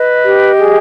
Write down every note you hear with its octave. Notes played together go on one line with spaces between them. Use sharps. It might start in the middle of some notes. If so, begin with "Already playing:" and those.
Already playing: B4 D#5
G4
G#4